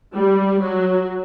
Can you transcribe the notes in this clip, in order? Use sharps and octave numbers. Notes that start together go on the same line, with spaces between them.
G3
F#3